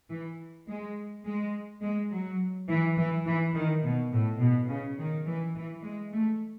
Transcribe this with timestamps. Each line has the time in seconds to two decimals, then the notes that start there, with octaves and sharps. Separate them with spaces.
0.10 E3
0.68 G#3
1.25 G#3
1.82 G#3
2.11 F#3
2.69 E3
2.97 E3
3.26 E3
3.54 D#3
3.83 B2
4.12 A2
4.40 B2
4.69 C#3
4.98 D#3
5.26 E3
5.55 E3
5.84 G#3
6.12 A3